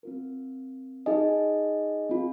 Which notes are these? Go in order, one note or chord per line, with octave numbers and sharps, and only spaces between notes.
C4 F4 A#4
D#4 G#4 D#5 G#5
C4 F4 A#4